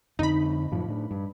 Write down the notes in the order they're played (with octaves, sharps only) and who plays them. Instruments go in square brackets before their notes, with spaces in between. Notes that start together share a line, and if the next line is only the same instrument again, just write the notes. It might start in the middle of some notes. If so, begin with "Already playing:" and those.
[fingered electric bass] F2 D3 [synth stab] D#4 B5
[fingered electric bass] F#2 A2 F3
A2 D4
G2